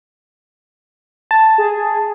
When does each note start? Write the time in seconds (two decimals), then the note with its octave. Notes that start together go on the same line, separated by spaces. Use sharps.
1.31 A5
1.58 G#4